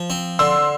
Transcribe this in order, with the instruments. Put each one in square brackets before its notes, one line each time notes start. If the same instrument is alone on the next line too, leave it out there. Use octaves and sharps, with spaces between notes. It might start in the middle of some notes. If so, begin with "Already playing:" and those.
Already playing: [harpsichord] F3
C4
[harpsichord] D3 [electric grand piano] C6 E6